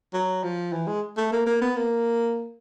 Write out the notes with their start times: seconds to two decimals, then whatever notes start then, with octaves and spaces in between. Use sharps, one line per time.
0.14 F#3
0.43 F3
0.72 E3
0.87 G#3
1.17 A3
1.32 A#3
1.46 A#3
1.61 B3
1.76 A#3